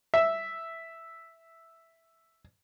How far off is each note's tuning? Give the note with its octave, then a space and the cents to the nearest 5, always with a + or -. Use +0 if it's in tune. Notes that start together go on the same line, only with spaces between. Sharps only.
E5 +0